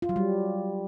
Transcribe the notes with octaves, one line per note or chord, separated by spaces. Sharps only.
F4
F#3
G3